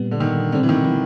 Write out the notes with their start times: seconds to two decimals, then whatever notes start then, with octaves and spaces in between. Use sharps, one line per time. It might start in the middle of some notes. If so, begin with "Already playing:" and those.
Already playing: A#2 G3 B3
0.11 D3
0.20 D#3
0.52 B2 D3 G3 C4
0.63 E3
0.69 D#3
0.84 E3